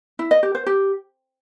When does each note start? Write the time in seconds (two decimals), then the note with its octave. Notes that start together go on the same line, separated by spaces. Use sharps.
0.19 E4
0.31 D#5
0.43 G4
0.55 C5
0.66 G4